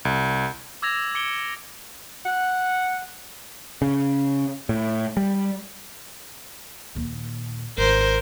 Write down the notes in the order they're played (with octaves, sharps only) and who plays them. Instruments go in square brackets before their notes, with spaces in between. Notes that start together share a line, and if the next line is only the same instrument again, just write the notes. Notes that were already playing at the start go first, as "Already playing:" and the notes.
[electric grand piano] C2
[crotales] D6 E6 G#6 A#6 F7
D6 C#7 D7 G7
[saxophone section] F#5
[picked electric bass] C#3
A2
G3
[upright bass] D#2 A#2
[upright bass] G#1 [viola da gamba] A#4 C5